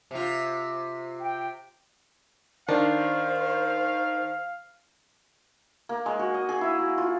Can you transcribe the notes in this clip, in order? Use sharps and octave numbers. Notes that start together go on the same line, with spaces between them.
C3 F4
G5
D#3 D4 C5 F5
A#3
G#3
F#4
D#5
G#4
E4
F#4
F4